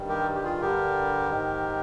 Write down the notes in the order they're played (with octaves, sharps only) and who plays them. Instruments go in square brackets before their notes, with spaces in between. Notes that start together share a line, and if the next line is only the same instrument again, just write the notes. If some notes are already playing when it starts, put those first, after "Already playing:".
Already playing: [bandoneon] G2 D#3 G3
G4 A#4
G4
F4 G#4
G2 D3 G3 G4 A#4
G#2 D#3 G#3